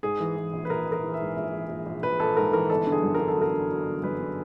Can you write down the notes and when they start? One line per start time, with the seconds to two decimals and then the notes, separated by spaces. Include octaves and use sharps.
0.03 G#2 G#4
0.20 E3
0.37 E3
0.53 A#1
0.65 B4
0.69 A#1 A#4
0.87 A#1
0.92 A#4
1.03 E3
1.14 E5
1.20 G#2
1.36 A#1 E5
1.54 E3
1.70 A#1
1.86 A#1
2.03 A#1 B4
2.20 A#1 A4
2.37 G#2 A#4
2.53 E3 A#4
2.70 G1 A4
2.87 D3
2.92 G#4
3.03 F#2
3.14 A#4
3.20 D3
3.28 A4
3.37 F#3 A#4
3.54 D3
3.70 F#3
3.87 G1
4.04 F#2 B4
4.20 D3